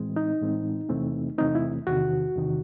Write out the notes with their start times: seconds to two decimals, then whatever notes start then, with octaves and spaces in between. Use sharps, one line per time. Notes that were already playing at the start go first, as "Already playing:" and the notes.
Already playing: A2 E3 G#3 C4
0.16 D#4
0.41 A2 E3 G#3 C4
0.89 E2 C3 E3 A3 C4
1.38 E2 C3 E3 A3 C4 D#4
1.55 E4
1.87 E2 C3 D#3 F#4
2.35 E2 C3 D#3